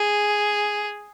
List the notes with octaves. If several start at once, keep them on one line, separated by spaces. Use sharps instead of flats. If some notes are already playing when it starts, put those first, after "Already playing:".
Already playing: G#4